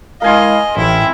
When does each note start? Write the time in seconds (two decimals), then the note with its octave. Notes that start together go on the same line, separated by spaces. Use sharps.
0.22 G#3 E4 A#4 D#5 F5 G#5 C6
0.77 A1 C4 E4